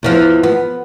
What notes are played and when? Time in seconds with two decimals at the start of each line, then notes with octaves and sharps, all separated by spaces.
0.03 E2 E3 F3
0.43 B3